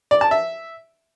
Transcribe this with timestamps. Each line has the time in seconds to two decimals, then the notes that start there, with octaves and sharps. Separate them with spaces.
0.11 D5
0.21 A5
0.31 E5